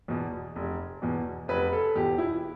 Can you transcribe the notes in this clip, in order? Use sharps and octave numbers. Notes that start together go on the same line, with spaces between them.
E2 B2
F1
E2 B2
F1 B4
A4
E2 B2 G4
E4